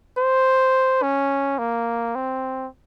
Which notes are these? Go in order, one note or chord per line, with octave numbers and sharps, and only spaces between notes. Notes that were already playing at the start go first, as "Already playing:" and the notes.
C5
C#4
A#3
C4